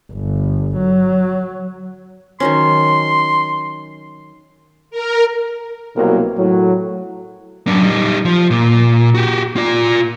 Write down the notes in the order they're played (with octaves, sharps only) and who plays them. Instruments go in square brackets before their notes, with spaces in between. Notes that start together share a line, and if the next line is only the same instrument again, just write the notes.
[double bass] G1
F#3
[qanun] D#3 F#3 C#4 [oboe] C6
[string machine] A#4
[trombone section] C2 B2 F#3 A#3 A#4
A2 F#3
[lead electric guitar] F#2 D4
G3 D#4
F3
A#2
F#4 G4
F4 D5